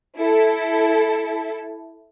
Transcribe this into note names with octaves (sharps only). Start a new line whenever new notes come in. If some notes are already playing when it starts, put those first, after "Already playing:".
E4 A4